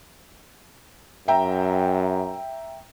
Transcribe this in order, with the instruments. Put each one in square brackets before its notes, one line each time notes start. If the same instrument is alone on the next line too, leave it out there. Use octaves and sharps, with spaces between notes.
[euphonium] F#2 [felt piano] E5 G5 A#5